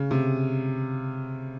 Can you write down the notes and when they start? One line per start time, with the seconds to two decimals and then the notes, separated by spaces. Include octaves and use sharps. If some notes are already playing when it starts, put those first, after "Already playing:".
Already playing: C#3
0.11 C3